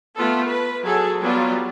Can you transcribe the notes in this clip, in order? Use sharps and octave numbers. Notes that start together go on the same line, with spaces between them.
A3 B3 F4 A4
B4
F#3 G#4 A4
F#3 G3 B3 F4